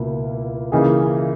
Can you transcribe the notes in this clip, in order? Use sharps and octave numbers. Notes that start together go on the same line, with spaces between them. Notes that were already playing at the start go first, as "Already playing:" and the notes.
Already playing: C#2 B2 A#3 E4
C#3 E3 A#3 D#4 G#4